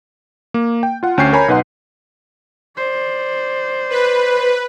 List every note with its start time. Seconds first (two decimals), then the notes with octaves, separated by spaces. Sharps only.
0.54 A#3
0.83 G5
1.03 F4 F#5
1.18 D2 C#4 G5 C#6 G6 C7
1.33 A#4 C#5 G#5 A#5 B5
1.48 B1 D#4 B4 F#5 C6
2.77 C5 D5
3.90 B4